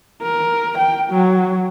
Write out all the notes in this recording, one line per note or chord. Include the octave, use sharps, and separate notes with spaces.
A#4
G5
F#3